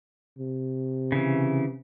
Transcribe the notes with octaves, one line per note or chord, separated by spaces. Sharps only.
C3
C#3 E3